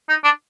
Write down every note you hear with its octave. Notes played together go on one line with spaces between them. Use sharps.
D#4
D4